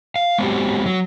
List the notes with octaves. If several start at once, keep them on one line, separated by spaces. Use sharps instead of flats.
F5
G#3 B3 C4 F#4 G4
F#3